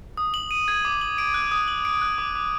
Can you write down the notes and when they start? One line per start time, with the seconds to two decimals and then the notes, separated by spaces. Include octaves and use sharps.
0.17 D#6
0.34 F#7
0.51 D#7
0.68 G#6
0.85 D6
1.01 F#7
1.18 D7
1.34 F#6
1.51 D#6
1.68 F#7
1.85 D7
2.02 F#6
2.18 D6
2.35 D6